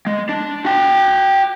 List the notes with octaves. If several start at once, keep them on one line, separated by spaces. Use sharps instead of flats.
G#3
D4
F#4 G5